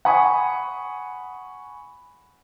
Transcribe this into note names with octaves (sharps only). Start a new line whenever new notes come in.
F#5 G#5 B5 C#6 D#6